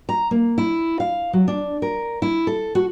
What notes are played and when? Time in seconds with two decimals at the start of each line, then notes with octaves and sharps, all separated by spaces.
0.09 A#5
0.31 A#3
0.58 E4
1.00 F5
1.33 F#3
1.48 D4
1.82 A#4
2.22 E4
2.47 A4
2.75 F#4